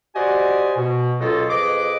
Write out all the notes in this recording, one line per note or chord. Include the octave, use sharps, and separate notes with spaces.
F#4 G4 C5 D5 D#5 G#5
B2
C#2 B2 F#3 F4 A4 D#5
F2 G#4 B4 D#5 D6